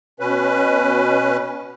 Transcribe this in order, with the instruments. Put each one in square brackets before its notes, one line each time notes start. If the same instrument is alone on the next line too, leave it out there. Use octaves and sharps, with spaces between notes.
[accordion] B2 C#4 B4